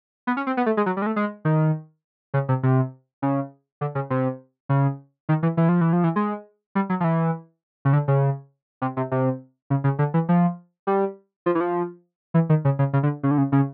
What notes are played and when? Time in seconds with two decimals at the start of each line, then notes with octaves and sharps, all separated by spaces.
0.27 B3
0.37 C#4
0.47 C4
0.57 B3
0.66 A3
0.77 G#3
0.86 F#3
0.97 G3
1.02 G#3
1.06 A3
1.16 G#3
1.45 D#3
2.34 C#3
2.49 C3
2.63 C3
3.22 C#3
3.81 D3
3.95 C#3
4.10 C3
4.69 C#3
5.29 D#3
5.43 E3
5.57 E3
5.69 F3
5.81 E3
5.93 F3
6.04 E3
6.16 G#3
6.75 G3
6.89 F#3
7.00 F3
7.04 E3
7.85 C#3
7.93 D3
8.08 C#3
8.82 C3
8.97 C3
9.11 C3
9.70 C#3
9.84 C#3
9.99 D3
10.14 E3
10.29 F3
10.87 G3
11.46 F3
11.55 E3
11.60 F3
12.34 E3
12.49 D#3
12.65 C#3
12.79 C#3
12.93 C#3
13.03 D3
13.23 C#3
13.31 D3
13.38 C#3
13.52 C#3